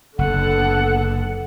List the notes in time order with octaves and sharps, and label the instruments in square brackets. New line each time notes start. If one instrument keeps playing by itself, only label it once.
[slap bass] F#1 [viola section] D3 B3 A4 [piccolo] F#5